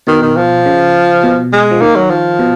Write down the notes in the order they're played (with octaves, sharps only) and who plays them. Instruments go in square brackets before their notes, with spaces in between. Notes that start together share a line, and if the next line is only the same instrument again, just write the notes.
[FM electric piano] B2 [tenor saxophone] D#3
[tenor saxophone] D#3
F3
[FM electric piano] C#3
B2
[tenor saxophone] G#3
[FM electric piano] F3
[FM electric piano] D#3 [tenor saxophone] A#3
[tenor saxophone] F#3
F3
[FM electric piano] B2